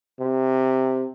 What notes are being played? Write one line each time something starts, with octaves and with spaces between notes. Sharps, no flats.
C3